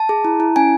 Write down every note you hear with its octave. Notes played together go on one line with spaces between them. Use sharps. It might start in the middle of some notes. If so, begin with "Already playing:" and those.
Already playing: A5
G#4
E4
E4
C#4 G#5